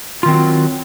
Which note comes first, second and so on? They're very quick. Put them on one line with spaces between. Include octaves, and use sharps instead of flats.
F4 D#3 C4 F#3